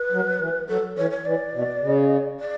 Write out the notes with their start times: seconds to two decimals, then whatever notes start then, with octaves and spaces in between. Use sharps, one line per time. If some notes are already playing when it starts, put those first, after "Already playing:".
Already playing: B4
0.12 F#3
0.40 E3
0.69 F#3 A4
0.97 E3 C#5
1.11 C#5
1.26 E3 D5
1.54 B2
1.83 C#3
2.40 D5